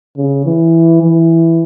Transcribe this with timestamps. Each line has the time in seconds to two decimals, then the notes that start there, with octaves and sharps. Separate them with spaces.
0.17 C#3
0.45 E3
1.02 E3